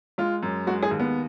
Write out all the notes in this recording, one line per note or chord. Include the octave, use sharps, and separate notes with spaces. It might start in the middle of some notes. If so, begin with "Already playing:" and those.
G#3 F4
F#2
G#3 F#4
G#4
D#2
B3